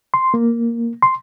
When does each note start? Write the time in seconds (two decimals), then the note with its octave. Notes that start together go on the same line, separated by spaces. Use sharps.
0.14 C6
0.34 A#3
1.02 C6